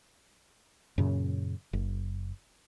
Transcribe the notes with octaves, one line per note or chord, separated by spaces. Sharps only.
F#2 A#2 C#3
F#1